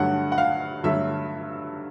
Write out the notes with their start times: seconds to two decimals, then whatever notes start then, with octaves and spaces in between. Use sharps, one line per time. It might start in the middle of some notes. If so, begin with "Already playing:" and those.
Already playing: G2 D3 F#3 A3 F#5
0.32 F#5
0.38 F5
0.84 G2 D3 F#3 A3 E5